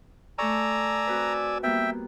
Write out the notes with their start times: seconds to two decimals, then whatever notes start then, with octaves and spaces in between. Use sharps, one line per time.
0.38 A3 A4 D5 G#5 A#5 C#6 E6
1.07 C4 F#4 B4
1.63 G3 A#3 B3 E5 G5